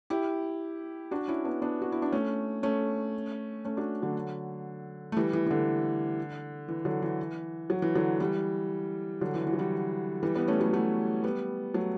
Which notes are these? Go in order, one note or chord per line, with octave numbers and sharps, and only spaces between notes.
E4 G4
D4 F#4
C#4 E4
B3 D4
B3 D4
F#4
E4
D4
A3 C#4
A3 C#4
A3 C#4
D4 F#4
D3 F#3
A3
E3 G3
E3
E3
D3
E3
D3 F#3
E3
F#3
E3
D3 F#3
E3 G3
D3 F#3
E3
E3
F#3
E3 G3
E3 G3
G3 B3
A3 C#4
F#3 A3
F#3 A3
G3 B3
F#3 A3